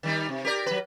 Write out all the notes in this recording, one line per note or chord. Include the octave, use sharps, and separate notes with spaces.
D#3 G3 D#4
C3
G4 A#4 D5
F#3 B4